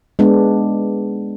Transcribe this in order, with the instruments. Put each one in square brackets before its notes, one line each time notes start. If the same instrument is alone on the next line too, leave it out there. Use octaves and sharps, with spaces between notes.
[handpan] G#3 B3 D4